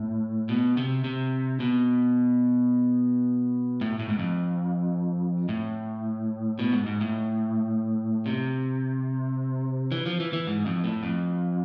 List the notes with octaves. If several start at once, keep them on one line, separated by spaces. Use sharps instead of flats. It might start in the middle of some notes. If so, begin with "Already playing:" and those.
Already playing: A2
B2
C3
C3
B2
A2
A2
G#2
F2
A2
B2
G#2
G#2
A2
C3
E3
F3
E3
E3
G#2
F2
A2
F2